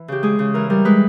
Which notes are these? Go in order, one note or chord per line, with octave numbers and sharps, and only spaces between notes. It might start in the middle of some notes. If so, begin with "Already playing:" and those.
Already playing: E3
C#3 G4
G#3 G#4
C#3
E3 A#4
G3 A#4
G#3 B4